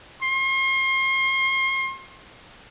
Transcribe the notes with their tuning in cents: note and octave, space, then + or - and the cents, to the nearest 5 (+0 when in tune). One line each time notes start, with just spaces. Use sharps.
C6 +40